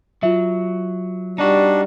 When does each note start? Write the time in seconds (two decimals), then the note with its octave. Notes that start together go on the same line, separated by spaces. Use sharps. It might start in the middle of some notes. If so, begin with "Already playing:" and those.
0.23 F#3 F4 E5
1.38 G3 D4 D#4 F#4